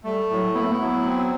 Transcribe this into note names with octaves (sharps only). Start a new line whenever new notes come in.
G3 A3
A2 F#3
B3 E4
A3
B3
F#3
C4